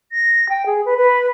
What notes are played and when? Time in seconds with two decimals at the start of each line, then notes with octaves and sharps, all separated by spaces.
0.12 A#6
0.49 G5
0.66 G#4
0.85 B4
0.97 B4